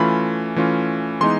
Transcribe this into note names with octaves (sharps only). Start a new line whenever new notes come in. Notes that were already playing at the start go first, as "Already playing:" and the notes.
Already playing: E3 A3 C#4 F4 B5
E3 A3 C#4 F4
E3 G#3 B3 D#4 C6